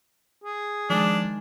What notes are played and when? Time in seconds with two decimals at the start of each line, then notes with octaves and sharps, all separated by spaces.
0.44 G#4
0.90 D#3 F3 G#3 D4 G#5